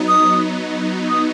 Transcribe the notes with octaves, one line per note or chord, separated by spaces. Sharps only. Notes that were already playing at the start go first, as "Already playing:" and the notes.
Already playing: F#3 B3 D#4
D#6
D#6